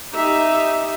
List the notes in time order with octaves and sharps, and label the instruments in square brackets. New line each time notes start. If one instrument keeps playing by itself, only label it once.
[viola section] D#4 G4 E5